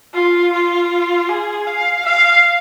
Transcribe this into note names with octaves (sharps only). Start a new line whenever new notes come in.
F4
F4
G#4
F5
F5